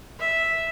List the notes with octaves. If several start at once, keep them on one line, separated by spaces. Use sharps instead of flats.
E5